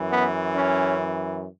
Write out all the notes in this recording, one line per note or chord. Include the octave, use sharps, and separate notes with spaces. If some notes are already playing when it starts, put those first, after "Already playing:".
Already playing: F#2 E3
B3
C#4